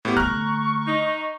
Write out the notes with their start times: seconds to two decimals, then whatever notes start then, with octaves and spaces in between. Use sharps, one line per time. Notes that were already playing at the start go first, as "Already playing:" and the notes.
0.05 A2 B3 G4
0.17 D3 A3 A#5 C#6 F6 F#6
0.87 D#4